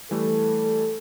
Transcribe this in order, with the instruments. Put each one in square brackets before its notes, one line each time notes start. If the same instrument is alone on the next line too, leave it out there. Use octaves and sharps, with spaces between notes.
[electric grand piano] E3 G3 A3 [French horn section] A4